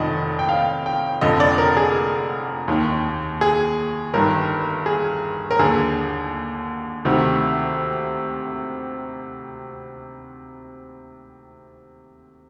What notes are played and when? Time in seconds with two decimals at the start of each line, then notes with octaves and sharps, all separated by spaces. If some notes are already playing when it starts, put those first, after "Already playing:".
Already playing: F1 F2 D#3 D5 D#5
0.39 G5
0.49 F5
0.86 G5
1.21 F1 F2 D3 D#5
1.40 D5
1.58 A#4
1.77 G#4
2.68 D#2 D#3
3.41 G#4
4.14 G1 G2 D#3 A#4
4.86 G#4
5.51 A#4
5.59 D#2 D3 G#4
7.05 D2 C3 D#3